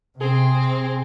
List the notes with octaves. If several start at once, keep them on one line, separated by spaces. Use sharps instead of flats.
C3 C4 G#4